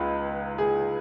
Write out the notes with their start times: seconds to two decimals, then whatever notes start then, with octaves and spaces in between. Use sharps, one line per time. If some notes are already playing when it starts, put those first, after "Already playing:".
Already playing: C#2 D#4 B4
0.58 G#4